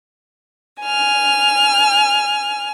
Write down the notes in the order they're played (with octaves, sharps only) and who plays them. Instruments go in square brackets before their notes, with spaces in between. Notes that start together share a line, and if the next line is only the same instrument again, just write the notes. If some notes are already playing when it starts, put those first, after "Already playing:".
[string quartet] G#5 F6